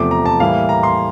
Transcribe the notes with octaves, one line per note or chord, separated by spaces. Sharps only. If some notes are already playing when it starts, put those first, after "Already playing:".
Already playing: E2 C3 F3 A3 D6
A#5
A5
A2 E3 G3 A#3 F5
A#5
C6